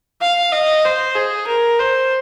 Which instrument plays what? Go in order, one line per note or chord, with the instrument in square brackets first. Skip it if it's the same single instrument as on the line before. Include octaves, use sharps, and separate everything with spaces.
[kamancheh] F5
D#5
C5
G#4
A#4
C5